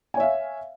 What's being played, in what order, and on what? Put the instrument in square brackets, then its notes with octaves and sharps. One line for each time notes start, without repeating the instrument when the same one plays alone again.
[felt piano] G#5
C#5
E5
F5